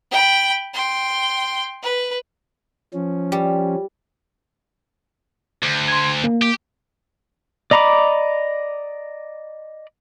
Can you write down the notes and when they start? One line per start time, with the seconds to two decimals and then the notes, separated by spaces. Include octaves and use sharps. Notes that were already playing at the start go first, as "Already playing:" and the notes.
0.11 G5 B5
0.74 G5 C6
1.82 B4
2.94 F3 C#4
3.32 G3
5.63 D2
5.88 C6 G#6
6.24 A#3
6.42 G4
7.71 D5 D#5 A#5 B5 D6